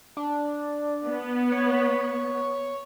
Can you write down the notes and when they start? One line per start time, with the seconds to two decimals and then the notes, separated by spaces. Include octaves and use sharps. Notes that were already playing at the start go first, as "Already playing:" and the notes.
0.17 D4
1.05 B3
1.52 C#5